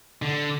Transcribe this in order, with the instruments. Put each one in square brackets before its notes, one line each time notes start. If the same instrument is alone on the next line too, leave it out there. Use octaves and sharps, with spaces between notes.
[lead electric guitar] D3